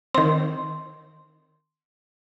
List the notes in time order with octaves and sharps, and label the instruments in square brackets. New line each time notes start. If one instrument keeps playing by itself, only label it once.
[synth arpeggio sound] D#3 C4 [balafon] C6